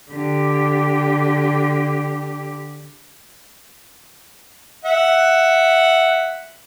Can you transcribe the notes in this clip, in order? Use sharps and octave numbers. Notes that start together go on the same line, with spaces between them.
D3 G4
E5 F#5